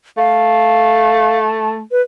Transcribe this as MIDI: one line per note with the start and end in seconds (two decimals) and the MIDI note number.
0.17 1.81 57
0.17 1.39 77
1.92 2.01 71